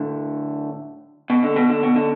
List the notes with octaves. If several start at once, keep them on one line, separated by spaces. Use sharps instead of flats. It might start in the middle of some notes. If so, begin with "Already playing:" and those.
Already playing: A2 D3
B2
D3
B2
D3
B2
D3